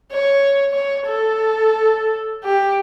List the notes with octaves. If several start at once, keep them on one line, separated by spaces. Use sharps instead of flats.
C#5
C#5
A4
G4